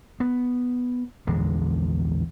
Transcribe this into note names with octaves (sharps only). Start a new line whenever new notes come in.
B3
A#1 E2 D3 G#3